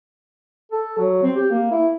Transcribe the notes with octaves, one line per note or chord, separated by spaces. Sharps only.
A4
F#3
C4
G4
A#3
E4